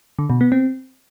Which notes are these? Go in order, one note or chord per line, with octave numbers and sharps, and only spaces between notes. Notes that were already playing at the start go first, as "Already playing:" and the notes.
D3
B2
B3
C4